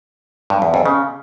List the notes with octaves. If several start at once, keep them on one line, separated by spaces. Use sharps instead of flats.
G2
E2
F2
C#3